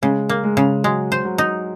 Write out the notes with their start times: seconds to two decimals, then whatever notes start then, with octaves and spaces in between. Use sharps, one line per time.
0.02 C#3 G#3
0.29 A#3
0.44 G#3
0.57 C#3
0.84 F#3 G#3
1.12 C5
1.25 F#3
1.38 D#4